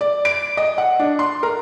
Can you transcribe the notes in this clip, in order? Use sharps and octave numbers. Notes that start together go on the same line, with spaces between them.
D5
D7
D#5
F#5
D4
C6
A#4